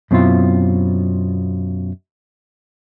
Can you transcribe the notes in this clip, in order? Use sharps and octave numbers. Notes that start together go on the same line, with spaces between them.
F#2 B2 C4 E4 F4